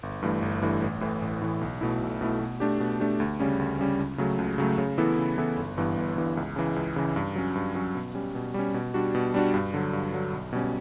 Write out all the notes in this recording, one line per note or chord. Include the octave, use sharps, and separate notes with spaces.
G1
G2 E3 A3
G1
G2 E3 A3
A1
A2 E3
A1
A2 E3
B1
B2 A3 E4
B1
B2 A3 E4
B2
A3 D4 G4
B2
A3 D4 G4
D2
C#3 G3 C#4
D2
C#3 G3 C#4
C#2
C#3 F#3 A3
C#2
C#3 F#3 A3
C#3
E3 B3 E4 A4
C#3
E3 B3 E4 A4
G1
G2 E3 B3
G1
G2 E3 B3
C#2
C#3 E3
C#2
C#3 E3
G2
F#3 C#4
G2
F#3 C#4
B2
G3 C#4
B2
G3 C#4
B2
G3 D4 F#4
B2
G3 D4 F#4
G2
D3 F#3
G2
D3 F#3
B1
B2 G3 C#4